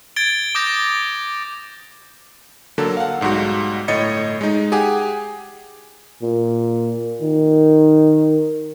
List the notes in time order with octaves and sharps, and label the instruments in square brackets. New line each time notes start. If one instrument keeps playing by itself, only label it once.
[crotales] G#6 A6 D7 G7
D6 D#6 G6 A#6 D7 G7
[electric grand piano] D3 F#3 A#3 A4
F5 F#5
B1 G#2 G3 F#4
G1 A2 C#5 D#5 A6 C#7
G#3 D#4
G4 G#4 F#5 G#5
[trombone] A#2
D#3